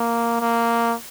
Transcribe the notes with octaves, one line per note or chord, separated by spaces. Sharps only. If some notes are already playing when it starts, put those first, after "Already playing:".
Already playing: A#3
A#3